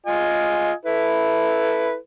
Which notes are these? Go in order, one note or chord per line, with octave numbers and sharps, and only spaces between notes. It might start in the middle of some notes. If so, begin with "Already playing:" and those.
F4 D#5 G#5
E4 A4 B4